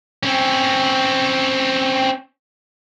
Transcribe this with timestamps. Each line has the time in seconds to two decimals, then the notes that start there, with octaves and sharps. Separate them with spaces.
0.23 C4 C#4